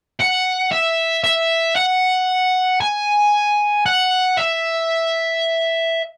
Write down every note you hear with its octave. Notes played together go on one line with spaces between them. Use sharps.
F#5
E5
E5
F#5
G#5
F#5
E5